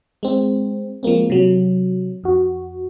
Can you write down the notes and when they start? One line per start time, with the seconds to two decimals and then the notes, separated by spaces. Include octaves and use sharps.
0.23 G#3 C4
1.03 F3 G#3 A#3 C4
1.30 C3 F#3
2.24 F2 F#4